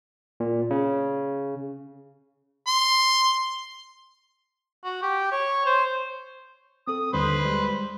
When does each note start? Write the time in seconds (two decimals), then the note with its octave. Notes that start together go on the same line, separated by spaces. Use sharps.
0.40 A#2
0.70 C#3
2.67 C6
4.84 F#4
5.03 G4
5.32 C#5
5.66 C5
6.87 C4 A4 D#6
7.13 D#2 D3 G3 B4 C5
7.45 G3 G#3